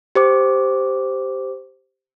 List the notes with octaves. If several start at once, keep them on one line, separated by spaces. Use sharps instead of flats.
G4 C5 D6